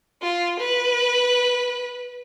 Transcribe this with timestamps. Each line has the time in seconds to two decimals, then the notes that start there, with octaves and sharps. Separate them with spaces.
0.22 F4
0.59 B4